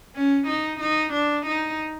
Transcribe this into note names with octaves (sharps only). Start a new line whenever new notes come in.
C#4
D#4
D#4
D4
D#4